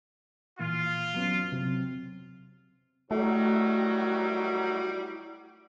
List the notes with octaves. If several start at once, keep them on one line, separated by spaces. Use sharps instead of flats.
A#2 E3 A#3 F4
F#3 B3 C#4
C3 F#3 C4
A2 D#3 F#3 G3 A3 E4 F#4